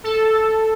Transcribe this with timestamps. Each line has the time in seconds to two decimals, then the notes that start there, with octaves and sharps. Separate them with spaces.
0.04 A4